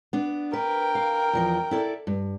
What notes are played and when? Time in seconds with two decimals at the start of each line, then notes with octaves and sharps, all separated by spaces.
0.13 B3 D4
0.53 A#4 B4 G5
0.95 F5
1.33 E2 F3 D#5
1.71 E4 A4 D5
2.07 G2